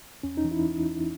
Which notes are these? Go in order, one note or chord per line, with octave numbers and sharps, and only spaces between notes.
E2 C#4
D#4
E3
E4